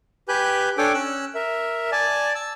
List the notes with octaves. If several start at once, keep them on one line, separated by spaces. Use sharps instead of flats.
G4 B4 G#5 F#6 G6
D4 A4 C#5 G5 G#5 D6
C#4 E6 F#6
A#4 E5
D5 G#5 A5
A5 E6